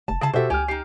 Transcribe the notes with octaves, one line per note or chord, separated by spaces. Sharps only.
F1 A5
C#3 E4 G#4 A5
B2 F#4 G4 A4 C5 E5
C#2 G4 G#5 F6
D#4 G4 C7